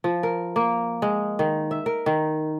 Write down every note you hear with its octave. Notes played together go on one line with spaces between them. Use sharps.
F3
A#4
A#3
G#3
D#3
E5
A#4
D#3